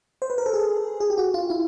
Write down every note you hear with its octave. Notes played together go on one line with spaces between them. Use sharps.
C5
B4
A#4
A4
G#4
G#4
G4
F#4
F4
E4